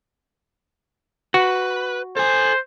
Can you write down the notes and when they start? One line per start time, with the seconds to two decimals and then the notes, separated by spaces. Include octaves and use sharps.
1.34 F#4 B4
2.17 A4 C5 G#5